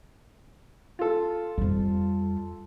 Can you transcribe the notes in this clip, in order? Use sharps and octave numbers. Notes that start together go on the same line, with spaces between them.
F4 A4
F2 G3